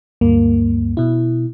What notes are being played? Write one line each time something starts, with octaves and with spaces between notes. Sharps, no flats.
D2 G2 A#3
B2 E4